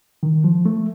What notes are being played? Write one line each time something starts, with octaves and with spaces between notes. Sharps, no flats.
D#3
F3
A3